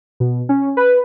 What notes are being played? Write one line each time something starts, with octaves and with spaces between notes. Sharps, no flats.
B2
C#4
B4